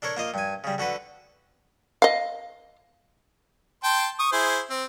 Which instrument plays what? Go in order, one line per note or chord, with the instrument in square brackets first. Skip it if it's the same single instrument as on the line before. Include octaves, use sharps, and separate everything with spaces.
[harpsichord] D4 A4 A#4 C#5
A#3 F4 D#5
G2 G#5
C#3 G3
D3 F#4 A4 B4
[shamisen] D#5 F5
[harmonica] G5 A5 C6
C#6 D#6
E4 G#4 C5
C4